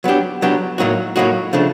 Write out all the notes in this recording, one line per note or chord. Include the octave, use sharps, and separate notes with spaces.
F#3 B3 D4 G4
F#3 B3 D4 G4
A2 F#3 A#3 D#4 F#4
A2 F#3 A#3 D#4 F#4
C#3 F3 A3 D4